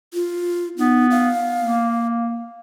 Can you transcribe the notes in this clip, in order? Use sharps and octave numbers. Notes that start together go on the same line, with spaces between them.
F4
B3 D#4
F5
A#3